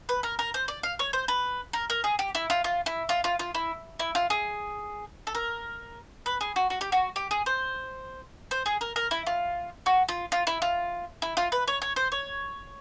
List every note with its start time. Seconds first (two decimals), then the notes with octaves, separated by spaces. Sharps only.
0.09 B4
0.23 A#4
0.39 A#4
0.54 C5
0.68 D5
0.83 F5
0.99 C#5
1.13 C5
1.28 B4
1.73 A#4
1.90 A#4
2.04 G#4
2.19 G4
2.35 E4
2.50 F4
2.64 F4
2.86 E4
3.09 F4
3.24 F4
3.39 F4
3.55 E4
4.00 E4
4.15 F4
4.30 G#4
5.27 A4
5.35 A#4
6.26 B4
6.41 G#4
6.56 F#4
6.70 F#4
6.81 G4
6.92 F#4
7.16 G4
7.31 G#4
7.46 C5
8.51 C5
8.66 G#4
8.81 A#4
8.96 A#4
9.11 E4
9.27 F4
9.86 F#4
10.09 F4
10.32 F4
10.47 E4
10.62 F4
11.22 E4
11.37 F4
11.52 B4
11.67 C#5
11.82 C#5
11.96 C5
12.12 C#5